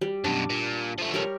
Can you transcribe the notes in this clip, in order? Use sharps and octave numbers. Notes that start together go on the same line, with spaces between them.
G3
F#2 B2 D4
A#2
F3 A3
G3 A#4 C#5